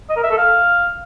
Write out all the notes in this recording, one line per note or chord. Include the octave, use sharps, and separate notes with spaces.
D#5
A#4
E5
A4
F5